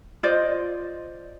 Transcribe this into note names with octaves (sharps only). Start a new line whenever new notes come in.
F4 C5 D5 D#5